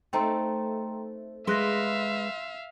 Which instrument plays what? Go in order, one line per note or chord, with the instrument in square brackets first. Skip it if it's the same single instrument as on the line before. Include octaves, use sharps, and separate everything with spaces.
[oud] A3 C4 D#4 [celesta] G5 A#5 C6
[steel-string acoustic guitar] G#3 B4 [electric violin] E5 F5 [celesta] C6 F#6 A#6